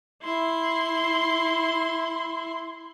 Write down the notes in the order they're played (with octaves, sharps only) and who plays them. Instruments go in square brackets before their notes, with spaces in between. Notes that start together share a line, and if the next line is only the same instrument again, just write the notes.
[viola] E4 C6